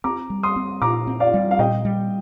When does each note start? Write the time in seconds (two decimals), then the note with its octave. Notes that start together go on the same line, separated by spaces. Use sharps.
0.04 C4 A#5 D6
0.30 G3
0.43 C6 D#6
0.56 C4
0.82 A#2 A#5 D6
1.07 C4
1.20 D5 F5
1.34 G3
1.51 F5
1.59 A#2 D#5 G5
1.85 G3